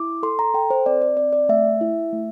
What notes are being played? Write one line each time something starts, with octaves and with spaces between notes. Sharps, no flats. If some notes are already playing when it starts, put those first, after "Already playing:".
Already playing: E4 D6
A4 C6
A#5
A4 G5
C5
C4 D5
D5
C4 D5
D5
A3 E5
E4
A3